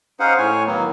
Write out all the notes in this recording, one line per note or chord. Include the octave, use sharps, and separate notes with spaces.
C#4 D#4 G#4 C5 F5 F#5
A2 C#5 G#5
D#3 F#3 A#3 B3